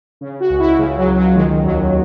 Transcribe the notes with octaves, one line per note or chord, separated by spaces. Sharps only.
C#3
F#4
C#2
E4
C#3 G#3
F#3
C#2
F#3
D#3 G#3
D#2 F#3